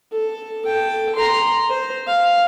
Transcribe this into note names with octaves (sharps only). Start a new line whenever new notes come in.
A4
A4 G5
A#5 C6
C5
F5